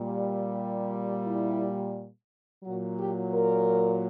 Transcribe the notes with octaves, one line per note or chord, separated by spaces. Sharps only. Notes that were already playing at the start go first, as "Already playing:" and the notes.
Already playing: A#2 G3
E4
A#2 F#3 F#4
G4
A#4